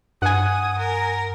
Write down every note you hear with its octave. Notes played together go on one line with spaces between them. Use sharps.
G2 F#5 G#5 D#6
A#4